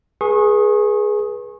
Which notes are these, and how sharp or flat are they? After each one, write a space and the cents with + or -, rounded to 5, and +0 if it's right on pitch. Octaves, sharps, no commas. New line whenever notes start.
G#4 +10 B4 -30 C#6 -35